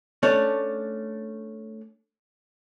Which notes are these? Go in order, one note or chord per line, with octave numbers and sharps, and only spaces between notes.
A3 C#4 D4 C#5